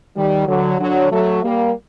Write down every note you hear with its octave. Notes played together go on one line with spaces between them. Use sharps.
D#3 G3
D3 F#3
D3 F#3
F#3 A3
G3 A#3